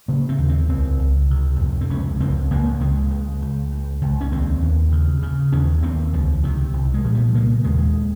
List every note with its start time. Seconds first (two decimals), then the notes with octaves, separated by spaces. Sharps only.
0.08 C#3 A#3
0.29 C4
0.38 D#2
0.49 C4
0.69 C#2 C4
1.00 C#2
1.30 C3
1.60 F2
1.81 C4
1.90 C#2 C#4
2.20 C#2 C4
2.50 C#2 A#3
2.80 C#2 G#3
3.10 C#2
3.42 C#2
3.72 C#2
4.01 C#2
4.21 C#4
4.32 D#2 C4
4.62 D#2
4.92 C#3
5.23 C#3
5.52 D#2 C#4
5.83 D#2 C4
6.13 C#2 F3
6.43 C3 D#3
6.73 C2
6.94 G#3
7.04 A#2 F3
7.15 G3
7.34 C#3 A#3
7.64 D#2 G#3